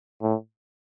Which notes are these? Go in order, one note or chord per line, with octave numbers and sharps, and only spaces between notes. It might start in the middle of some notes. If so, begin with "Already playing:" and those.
A2